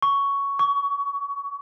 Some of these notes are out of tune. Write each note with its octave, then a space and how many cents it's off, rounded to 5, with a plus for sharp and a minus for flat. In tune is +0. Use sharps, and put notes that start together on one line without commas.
C#6 +10
C#6 +30